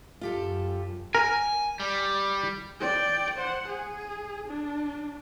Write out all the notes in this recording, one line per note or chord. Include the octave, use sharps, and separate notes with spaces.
F#2 F4 G4 A4
A#4 G#5
G3
D5 G5
C5 F#5
G#4
D4